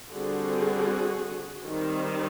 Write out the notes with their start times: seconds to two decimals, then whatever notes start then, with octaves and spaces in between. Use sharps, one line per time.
0.11 D3 G3 C4 F#4 G#4
1.64 D#3 G3 C4